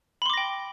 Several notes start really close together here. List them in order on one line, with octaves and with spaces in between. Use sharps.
B5 C6 D6 A#6 G5